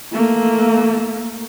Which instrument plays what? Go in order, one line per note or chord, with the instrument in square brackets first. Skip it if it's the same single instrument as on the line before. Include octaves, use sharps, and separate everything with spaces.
[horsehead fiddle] A3 A#3